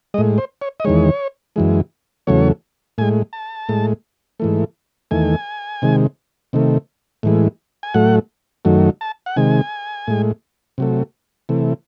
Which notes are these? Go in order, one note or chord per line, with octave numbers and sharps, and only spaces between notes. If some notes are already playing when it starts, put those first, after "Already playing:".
A2 G#3 D#5
C5
C#5
D#5
E2 D#3 G#3 C#5
F#2 E3 G#3
E2 C#3 F#3 A3 C#5
A2 G#3 G#5
A5
A2 G#3
G#2 E3 A3
E2 D#3 A3 G#5
C3 D#3 G#3
C3 D#3 A3
A2 E3 G#3
G#5
A2 F#3 A3 F#5
F#2 D#3 F#3 A3
A5
F#5
C3 D#3 G#3 G#5
A2 G#3
C3 F#3 A3
C3 E3 A3